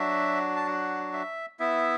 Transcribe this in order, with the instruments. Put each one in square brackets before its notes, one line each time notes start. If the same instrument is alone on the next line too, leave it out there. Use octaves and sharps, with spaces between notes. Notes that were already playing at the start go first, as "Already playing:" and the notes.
Already playing: [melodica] F#3 D4 F#4 E5
A5
F#5
E5
B3 E4 E5